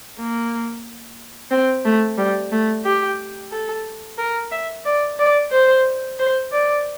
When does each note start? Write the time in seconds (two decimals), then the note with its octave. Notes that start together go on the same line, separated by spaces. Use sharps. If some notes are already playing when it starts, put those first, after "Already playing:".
0.19 A#3
1.51 C4
1.85 A3
2.18 G3
2.52 A3
2.85 G4
3.52 A4
4.18 A#4
4.52 E5
4.85 D5
5.19 D5
5.52 C5
6.19 C5
6.52 D5